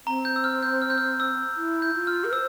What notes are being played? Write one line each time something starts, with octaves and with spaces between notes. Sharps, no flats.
C4 A#5
G6
E6
F6
G6
F6
G6
F6
E6
E4
G6
F4
F6
A#4
C5 E6